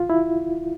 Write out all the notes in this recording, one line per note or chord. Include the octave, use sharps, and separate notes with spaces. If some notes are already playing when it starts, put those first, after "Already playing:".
Already playing: F4
E4